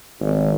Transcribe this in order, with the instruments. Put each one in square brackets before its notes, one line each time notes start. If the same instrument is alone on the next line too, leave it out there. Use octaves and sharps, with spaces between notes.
[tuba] G#1